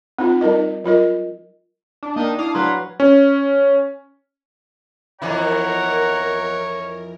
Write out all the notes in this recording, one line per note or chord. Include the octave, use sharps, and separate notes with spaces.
C4 D#4 F4
G3 D#4 A#4 D#5
F#3 F4 A#4 D#5
D4
D#3 A#3 D#5
D4 E4 F5 D#6
F#3 B4 A#5 C6 F#6
C#4
F2 E3 B3 E4 A#4 C#5 F#5 A#5